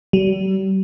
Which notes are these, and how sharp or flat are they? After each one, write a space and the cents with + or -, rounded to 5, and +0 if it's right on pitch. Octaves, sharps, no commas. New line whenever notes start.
G3 -40